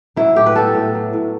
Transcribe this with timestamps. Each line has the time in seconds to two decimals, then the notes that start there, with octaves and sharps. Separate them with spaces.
0.16 F#3 E4
0.36 A2 G4
0.46 B4
0.55 B3 A4
0.75 A2
0.94 F#3
1.13 A2